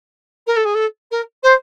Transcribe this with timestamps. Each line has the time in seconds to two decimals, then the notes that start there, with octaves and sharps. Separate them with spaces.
0.47 A#4
0.56 A4
0.65 G#4
0.74 A4
1.11 A#4
1.43 C5